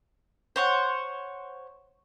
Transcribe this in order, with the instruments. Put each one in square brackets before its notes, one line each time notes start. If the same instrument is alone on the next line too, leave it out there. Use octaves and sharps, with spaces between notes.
[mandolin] C5 C#5 F#5